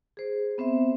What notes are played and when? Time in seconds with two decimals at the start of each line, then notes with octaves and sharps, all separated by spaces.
0.17 G#4 C5
0.58 B3 C4 C5 E5